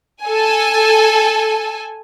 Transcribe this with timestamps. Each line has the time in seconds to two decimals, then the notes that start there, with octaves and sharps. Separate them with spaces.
0.23 A4 G#5